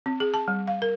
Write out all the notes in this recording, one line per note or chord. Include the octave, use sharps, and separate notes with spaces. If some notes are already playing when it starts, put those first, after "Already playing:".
C4
G#4
A5
G3
F5
A#4